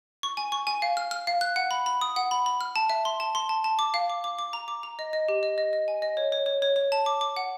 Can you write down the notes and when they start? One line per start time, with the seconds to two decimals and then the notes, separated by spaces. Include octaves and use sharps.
0.23 C#6
0.37 G#5
0.52 C#6
0.67 G#5
0.82 F5
0.97 F6
1.11 F6
1.27 F5
1.41 F#6
1.56 F#5
1.71 B5
1.86 B5
2.01 D#6
2.16 F#5
2.31 B5
2.46 B5
2.61 F6
2.76 A5
2.90 E5
3.05 C6
3.20 A5
3.35 C6
3.49 A5
3.64 A5
3.79 D6
3.94 F5
4.10 D6
4.24 D6
4.39 D6
4.53 A#5
4.68 D6
4.83 A#5
4.99 D#5
5.13 D#5
5.28 G4
5.43 D#5
5.58 D#5
5.73 D#5
5.88 G#5
6.02 D#5
6.17 C#5
6.32 C#5
6.46 C#5
6.62 C#5
6.76 C#5
6.92 A5
7.06 D6
7.21 D6
7.36 F#5